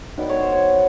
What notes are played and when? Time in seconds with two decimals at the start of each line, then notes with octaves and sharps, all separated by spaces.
0.18 D#3 F#3 B3 D5
0.29 C#5
0.41 C5
0.52 C#5